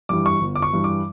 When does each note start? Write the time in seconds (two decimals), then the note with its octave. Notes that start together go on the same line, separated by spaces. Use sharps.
0.09 G2 E3 G3 D6
0.26 C#6
0.41 G1
0.56 D6
0.62 C#6
0.73 G2 E3 G3
0.84 D6